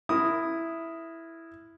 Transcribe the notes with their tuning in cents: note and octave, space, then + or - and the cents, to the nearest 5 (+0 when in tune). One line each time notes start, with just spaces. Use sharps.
E4 +0 A#4 +0 D#6 +0